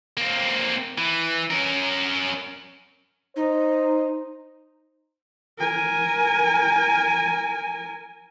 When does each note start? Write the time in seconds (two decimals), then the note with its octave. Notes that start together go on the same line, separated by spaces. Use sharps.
0.17 A#3 C4
0.98 E3
1.50 C#4 A#4
3.36 D#4 C5
5.58 A#4 G#5